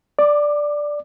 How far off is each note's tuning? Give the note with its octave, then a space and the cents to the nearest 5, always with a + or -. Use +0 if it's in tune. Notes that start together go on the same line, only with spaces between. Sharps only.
D5 +0 D6 +20